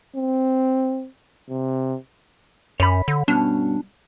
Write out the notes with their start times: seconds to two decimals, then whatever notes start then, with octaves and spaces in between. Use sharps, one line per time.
0.16 C4
1.50 C3
2.80 F#2 C#5 B5
3.08 D3
3.28 G2 B2 C#4 D4